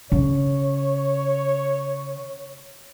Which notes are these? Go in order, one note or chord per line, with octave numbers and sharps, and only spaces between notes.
C#3 C#5